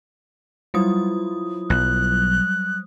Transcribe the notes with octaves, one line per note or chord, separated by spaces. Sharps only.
F#3 G3 E4 F4 D#6
B1 F#6